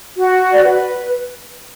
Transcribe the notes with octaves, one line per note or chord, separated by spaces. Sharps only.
F#4
D5
B4